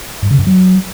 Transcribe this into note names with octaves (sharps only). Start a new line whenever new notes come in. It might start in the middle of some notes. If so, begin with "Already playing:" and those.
G2
C#3
F#2
F#3